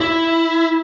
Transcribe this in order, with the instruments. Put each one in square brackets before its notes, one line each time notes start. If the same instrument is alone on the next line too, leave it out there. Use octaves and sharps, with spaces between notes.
[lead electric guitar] E4